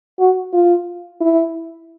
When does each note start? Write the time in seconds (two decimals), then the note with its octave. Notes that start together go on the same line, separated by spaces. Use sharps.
0.19 F#4
0.53 F4
1.21 E4